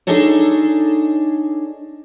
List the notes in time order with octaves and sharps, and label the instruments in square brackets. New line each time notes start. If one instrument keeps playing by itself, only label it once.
[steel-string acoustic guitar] D4 D#4 G#4 A4 C#5